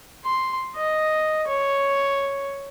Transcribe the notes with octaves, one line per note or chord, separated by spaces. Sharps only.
C6
D#5
C#5